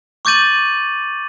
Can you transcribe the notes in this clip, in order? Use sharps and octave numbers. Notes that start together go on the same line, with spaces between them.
C#6 D6 G6 A6 D#7 F#7